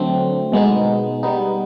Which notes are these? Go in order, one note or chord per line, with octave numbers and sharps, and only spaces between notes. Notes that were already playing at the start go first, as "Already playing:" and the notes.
Already playing: D3 F#3 A3 C4
B2 G#3 B3 D#4
G3 B3 D#4